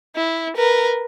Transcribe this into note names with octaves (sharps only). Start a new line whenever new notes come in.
E4
A#4 B4